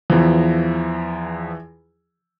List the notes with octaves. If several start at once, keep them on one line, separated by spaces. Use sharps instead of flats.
E2 E3 F3